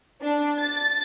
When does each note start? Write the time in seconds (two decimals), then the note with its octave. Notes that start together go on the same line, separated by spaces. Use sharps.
0.21 D4
0.59 A6